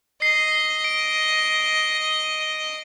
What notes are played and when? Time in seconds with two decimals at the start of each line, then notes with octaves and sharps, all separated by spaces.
0.22 D#5 C7
0.84 D7